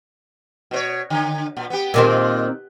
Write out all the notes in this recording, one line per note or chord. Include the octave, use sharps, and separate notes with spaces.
B2 C5 C#5
D3
A#2
B3 G4
A#2 D#3 G#3 C4